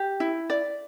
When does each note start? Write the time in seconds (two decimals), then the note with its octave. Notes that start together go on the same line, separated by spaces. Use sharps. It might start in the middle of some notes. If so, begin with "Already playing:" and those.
Already playing: G4
0.20 E4
0.50 D5